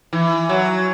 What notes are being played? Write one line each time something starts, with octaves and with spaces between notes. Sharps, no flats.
E3
F#3